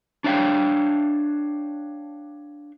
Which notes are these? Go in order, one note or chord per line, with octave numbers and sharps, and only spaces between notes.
D4 C#5 E5 F5 G5